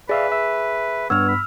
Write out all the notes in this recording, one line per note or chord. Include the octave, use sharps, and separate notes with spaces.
G#4 B4 D5 E5 F5
E5
G2 B3 C#5 E6 F6
B5